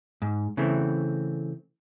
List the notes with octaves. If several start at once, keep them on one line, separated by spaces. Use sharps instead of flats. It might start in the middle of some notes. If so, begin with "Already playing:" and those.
G#2
C#3 E3 A3 C4